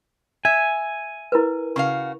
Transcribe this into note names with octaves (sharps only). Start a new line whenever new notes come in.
E5 G#5
E4 A#4 B4
C#3 F#4 F5 C#6